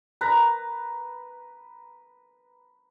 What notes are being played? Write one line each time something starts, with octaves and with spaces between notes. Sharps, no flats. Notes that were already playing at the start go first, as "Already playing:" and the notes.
B4 A#5